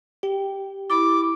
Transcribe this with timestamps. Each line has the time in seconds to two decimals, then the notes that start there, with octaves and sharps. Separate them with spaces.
0.23 G4 G5
0.90 E4 B5 D6